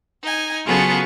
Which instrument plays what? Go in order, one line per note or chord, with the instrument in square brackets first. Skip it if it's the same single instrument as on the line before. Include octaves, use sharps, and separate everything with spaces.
[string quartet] D#4 G#5
C#3 F#3 B3 F4 G#4 A4